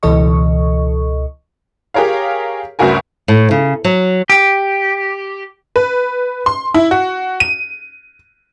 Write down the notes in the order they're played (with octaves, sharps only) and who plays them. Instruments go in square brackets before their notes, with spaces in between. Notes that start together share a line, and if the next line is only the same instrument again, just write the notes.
[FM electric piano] C#2 B2 E3 A4 D#5 C#6
[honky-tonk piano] G4 G#4 A#4 C#5 F5
G1 D2 C#3 F#4 A#4 G#5
[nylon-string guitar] A2
C#3
F#3
[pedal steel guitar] G4
[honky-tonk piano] B4
C6
E4
F#4
D#7